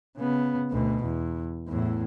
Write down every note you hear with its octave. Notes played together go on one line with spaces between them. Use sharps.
C#3 B3
D2 B2
E2
E2 A2